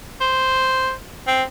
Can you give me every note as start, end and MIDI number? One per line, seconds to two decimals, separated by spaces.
0.21 0.92 72
1.27 1.43 60